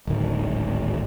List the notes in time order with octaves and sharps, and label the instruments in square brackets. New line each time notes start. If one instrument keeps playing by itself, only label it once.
[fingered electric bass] D1 G#1 D#3